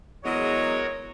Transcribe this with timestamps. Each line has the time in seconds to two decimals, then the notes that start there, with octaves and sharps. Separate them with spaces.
0.25 E2 F#3 G#3 F#4 A#4 C#5 D#5